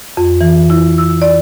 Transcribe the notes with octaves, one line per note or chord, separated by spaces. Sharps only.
F2
E3
E4
E6
D5